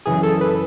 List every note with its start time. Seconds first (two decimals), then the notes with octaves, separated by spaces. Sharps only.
0.06 F#2 C#3 E3 G#4
0.23 A4
0.41 B4